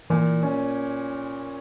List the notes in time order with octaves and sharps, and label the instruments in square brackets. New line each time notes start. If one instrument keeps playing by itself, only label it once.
[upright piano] A#2 [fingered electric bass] E3
[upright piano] C#4